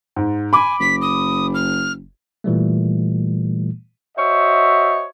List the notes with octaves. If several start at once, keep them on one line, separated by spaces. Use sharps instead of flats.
G#2
G#5 B5 D6
F#1 B6
D#6
F6
A#2 E3 G3 A3
F#4 C5 C#5 D#5 E5